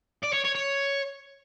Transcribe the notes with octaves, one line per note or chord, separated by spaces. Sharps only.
D5
C#5
C#5
C#5